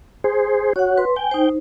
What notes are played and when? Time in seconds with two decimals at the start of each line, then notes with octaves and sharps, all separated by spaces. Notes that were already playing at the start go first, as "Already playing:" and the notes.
0.24 G#4 C5
0.76 F#4 C#5 F#5
0.97 B4 C6
1.16 G5 G#5
1.31 D#4 C5